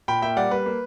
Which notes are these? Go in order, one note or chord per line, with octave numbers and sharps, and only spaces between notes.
A#2 G5 B5
A#3 E5 G5
G3 D5 F#5
G3 B4
A#3